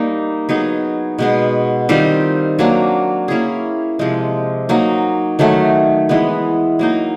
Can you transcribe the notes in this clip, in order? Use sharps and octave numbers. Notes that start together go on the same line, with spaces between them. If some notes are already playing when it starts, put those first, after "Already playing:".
Already playing: G3 A#3 D#4
F#3 B3 D#4 G#4
B2 G#3 B3
D#3 G3 C4 F4
F#3 A#3 D4
A#3 C#4 E4 G#4
C3 F3 G#3
F#3 A#3 D#4
D#3 F#3 A3
E3 G#3 B3
F#3 A#3 D#4